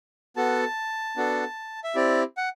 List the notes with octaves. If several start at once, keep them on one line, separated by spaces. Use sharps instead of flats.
B3 F#4 A4 A5
B3 D4 F#4 A4
E5
C4 E4 G4 D5
F#5